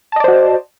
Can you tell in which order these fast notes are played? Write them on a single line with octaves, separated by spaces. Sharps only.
A5 D#5 D5 C5 F#4